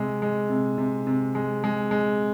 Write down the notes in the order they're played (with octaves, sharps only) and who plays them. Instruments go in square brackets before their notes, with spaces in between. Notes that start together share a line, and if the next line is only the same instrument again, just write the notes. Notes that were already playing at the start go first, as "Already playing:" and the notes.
Already playing: [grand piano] C3 G#3
G#3
C3
C3
C3
G#3
G#3
G#3